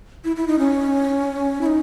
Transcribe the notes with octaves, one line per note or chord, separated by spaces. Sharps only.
E4
E4
D#4
C#4
E4
D#4